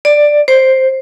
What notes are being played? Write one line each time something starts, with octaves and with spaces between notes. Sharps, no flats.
D5
C5